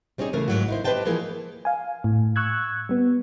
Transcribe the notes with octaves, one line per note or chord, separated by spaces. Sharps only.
G3 C4 C#4 D#4 G#4
C#3 E3 A3 G#4 A#4
G#2 D#3 F#3 A#3 F#4
D#4 E4 C5
G4 B4 C5 D#5 G5 A5
E3 F3 A#3 G#4 A#4
F5 G#5
A2
C#6 E6 F#6 G#6
G3 B3